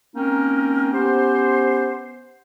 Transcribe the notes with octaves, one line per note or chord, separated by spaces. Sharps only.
A#3 C4 C#4 D#4 A#4
B3 C#4 G4 C5